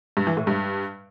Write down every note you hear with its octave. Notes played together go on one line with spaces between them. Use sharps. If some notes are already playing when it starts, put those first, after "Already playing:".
G2
E3
A2
G2